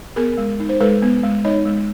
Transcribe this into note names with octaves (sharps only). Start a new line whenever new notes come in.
B3 G#4 A#4
G#3
D#4
C5
G#3 A4 B4
B3
G#3
D#4 C#5 D#5
G#3